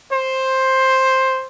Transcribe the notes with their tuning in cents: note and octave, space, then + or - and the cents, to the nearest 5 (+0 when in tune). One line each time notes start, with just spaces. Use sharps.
C5 +10